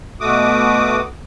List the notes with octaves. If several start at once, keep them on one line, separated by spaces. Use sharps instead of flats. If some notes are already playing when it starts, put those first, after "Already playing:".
B2 A3 F#4 D6 D#6